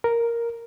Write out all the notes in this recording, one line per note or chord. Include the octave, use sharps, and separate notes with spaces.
A#4